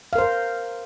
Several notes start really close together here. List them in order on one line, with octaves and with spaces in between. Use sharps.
F5 A#4 C5